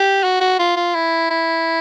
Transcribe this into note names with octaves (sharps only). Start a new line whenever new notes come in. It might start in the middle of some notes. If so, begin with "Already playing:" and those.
Already playing: G4
F#4
F#4
F4
F4
E4
E4